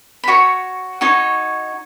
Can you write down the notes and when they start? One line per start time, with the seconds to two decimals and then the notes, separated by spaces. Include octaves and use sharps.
0.24 B5
0.28 F#4 C#5 C#6
1.01 D#4 F#4 C#5